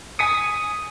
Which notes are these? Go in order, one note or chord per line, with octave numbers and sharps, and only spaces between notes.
G#5 D#6 B6 C#7